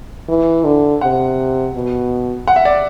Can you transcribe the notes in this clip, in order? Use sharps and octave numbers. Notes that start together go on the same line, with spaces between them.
E3
D3
C3 F#5
B2
F#5
E5
D5